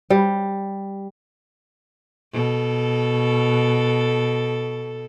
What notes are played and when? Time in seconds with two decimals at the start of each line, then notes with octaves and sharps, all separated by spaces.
0.10 G3
2.33 B2 A4